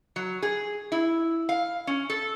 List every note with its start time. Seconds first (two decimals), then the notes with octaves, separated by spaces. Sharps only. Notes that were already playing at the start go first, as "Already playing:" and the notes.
0.16 F#3
0.42 G#4
0.92 E4
1.49 F5
1.87 C#4
2.10 A4